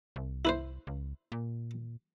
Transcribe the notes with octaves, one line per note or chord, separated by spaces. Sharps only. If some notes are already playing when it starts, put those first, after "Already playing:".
C2
E4 B4 C5
C#2
A#2